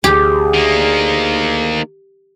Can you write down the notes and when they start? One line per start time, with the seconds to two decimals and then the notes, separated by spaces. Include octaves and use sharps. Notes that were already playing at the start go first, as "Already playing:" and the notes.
0.04 D2 G4 G#4
0.54 D#3 A#3